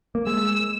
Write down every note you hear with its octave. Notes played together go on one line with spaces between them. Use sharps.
A#3
G#3 E6